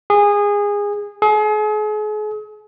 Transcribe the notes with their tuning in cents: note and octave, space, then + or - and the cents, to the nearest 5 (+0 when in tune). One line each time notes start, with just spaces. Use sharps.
G#4 -20
G#4 +40